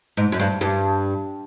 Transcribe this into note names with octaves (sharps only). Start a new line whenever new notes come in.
G#2
F#2
G2
G2